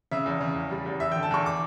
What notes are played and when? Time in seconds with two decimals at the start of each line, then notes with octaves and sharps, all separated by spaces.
0.11 C#3 E5
0.26 E2
0.41 C#3
0.55 E2
0.71 G3
0.86 E2
1.00 E2 E5
1.12 D3 G5
1.23 A5
1.31 E2 C#6
1.46 D6